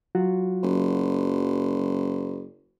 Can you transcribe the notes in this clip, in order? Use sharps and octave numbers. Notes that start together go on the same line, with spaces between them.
F#3 F4 F#4
F#1